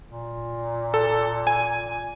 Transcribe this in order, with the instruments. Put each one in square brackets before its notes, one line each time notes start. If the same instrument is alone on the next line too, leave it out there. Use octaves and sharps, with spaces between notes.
[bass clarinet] A#2
[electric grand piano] A4
G#5